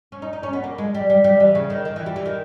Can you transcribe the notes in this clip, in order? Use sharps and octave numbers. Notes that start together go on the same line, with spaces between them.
C#4
D#4
D#4
C#4
B3
A#3
G#3
G3
G3
G3
E3
C#3
D#3
D#3
E3
G3
E3
D#3